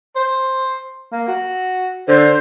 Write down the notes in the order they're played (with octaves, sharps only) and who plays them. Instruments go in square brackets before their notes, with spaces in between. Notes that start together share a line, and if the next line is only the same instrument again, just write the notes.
[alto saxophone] C5
A#3
F#4
[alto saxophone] D3 [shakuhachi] C5